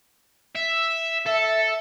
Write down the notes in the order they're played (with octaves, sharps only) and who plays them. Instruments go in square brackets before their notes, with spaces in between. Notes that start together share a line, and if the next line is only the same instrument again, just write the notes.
[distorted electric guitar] E5
[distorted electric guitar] A4 [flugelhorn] E5